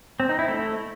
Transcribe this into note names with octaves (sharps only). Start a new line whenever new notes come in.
C4
D#4
E4
A3